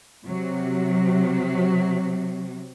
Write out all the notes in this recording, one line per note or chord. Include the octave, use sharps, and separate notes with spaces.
C3 F#3